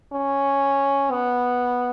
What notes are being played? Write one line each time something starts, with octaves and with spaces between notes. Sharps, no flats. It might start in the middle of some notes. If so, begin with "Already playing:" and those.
C#4
B3